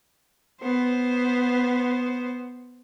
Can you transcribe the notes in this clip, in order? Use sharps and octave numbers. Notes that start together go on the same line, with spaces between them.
B3 C5